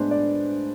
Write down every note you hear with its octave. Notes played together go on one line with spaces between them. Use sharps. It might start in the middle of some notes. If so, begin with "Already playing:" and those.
Already playing: A2 G#3 B3 D4 B4 C5
D5